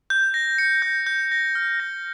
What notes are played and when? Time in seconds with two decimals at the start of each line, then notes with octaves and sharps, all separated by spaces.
0.10 G6
0.34 A#6
0.58 C#7
0.82 G6
1.07 G6
1.32 A#6
1.55 F6
1.80 A#6